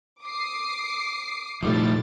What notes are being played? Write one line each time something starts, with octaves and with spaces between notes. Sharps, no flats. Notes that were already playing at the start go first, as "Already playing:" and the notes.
D6 D#6 C7
F1 A#2 F3 G3 A3 D#4 E4 A6